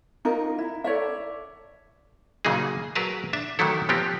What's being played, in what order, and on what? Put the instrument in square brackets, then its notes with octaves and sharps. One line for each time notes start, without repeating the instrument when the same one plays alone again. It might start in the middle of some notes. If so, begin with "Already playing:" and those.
[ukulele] D#4 F4 A#4
E4
A4 C#5 D5 E5
[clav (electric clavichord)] A#2 C#3 F#3 A#3 D#4 G#4
F#3 G#4 A#4 B4 A5
D4 E5
D#3 E3 F#3 A3 E4 A4
F3 B3 C4 G4